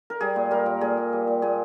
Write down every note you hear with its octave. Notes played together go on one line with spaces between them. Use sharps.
A#4
G3 G#4
A#2
G3 A#4
A#2
A#2 G#4
A#2
G3
A#2
A#2 G#4